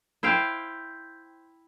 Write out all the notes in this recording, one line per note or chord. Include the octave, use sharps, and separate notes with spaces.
E4 C5 F5 G5